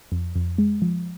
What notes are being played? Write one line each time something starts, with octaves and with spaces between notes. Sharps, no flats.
F2
F2
G#3
F3